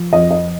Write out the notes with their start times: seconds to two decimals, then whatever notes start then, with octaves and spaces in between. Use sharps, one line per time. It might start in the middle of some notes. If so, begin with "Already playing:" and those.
Already playing: F3
0.13 F2 D#5
0.31 D#5